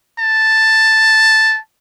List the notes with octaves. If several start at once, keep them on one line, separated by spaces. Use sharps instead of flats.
A5